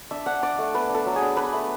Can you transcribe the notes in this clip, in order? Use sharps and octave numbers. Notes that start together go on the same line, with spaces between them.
D4 E5
D4 F#5
D4 D5
A3
B3 B4
D4
A4
F#3
G#4
D4
D4 B4
A3